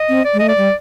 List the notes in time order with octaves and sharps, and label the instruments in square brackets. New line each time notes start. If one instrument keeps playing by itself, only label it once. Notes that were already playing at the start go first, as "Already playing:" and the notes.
Already playing: [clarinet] D#5
[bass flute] C4
[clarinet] D5
[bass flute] G#3
[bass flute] A3 [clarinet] D#5
[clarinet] D5
[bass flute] G3